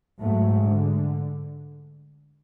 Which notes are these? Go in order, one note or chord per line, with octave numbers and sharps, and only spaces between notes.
G#2 F#3 A3
D3